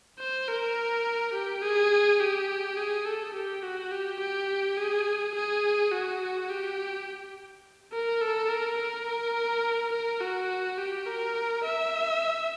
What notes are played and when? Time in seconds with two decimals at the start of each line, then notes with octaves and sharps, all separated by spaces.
0.19 C5
0.47 A#4
1.33 G4
1.62 G#4
2.20 G4
2.76 G#4
3.05 A4
3.34 G4
3.63 F#4
3.91 G4
4.20 G4
4.77 G#4
5.35 G#4
5.92 F#4
6.49 G4
7.92 A#4
8.21 A4
8.49 A#4
8.77 A#4
9.93 A#4
10.21 F#4
10.78 G4
11.06 A#4
11.64 E5